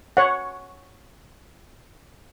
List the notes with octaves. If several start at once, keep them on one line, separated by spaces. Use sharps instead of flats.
C#5 F#5